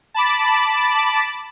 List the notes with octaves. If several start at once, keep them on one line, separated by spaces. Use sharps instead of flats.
A5 B5 D6